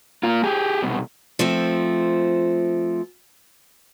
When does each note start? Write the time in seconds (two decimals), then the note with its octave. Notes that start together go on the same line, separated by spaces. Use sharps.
0.23 A#3 F4
0.44 G4 G#4
0.82 C2 B2
1.39 F3 A3 C4